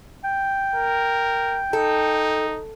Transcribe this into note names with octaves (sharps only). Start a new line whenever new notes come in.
G5
A#4
D#4 A4